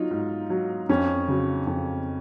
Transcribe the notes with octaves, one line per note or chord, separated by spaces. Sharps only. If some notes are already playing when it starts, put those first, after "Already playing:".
Already playing: F#3 D#4 F4
G#2
F#3
F2 C#4
C#3 F#3
F2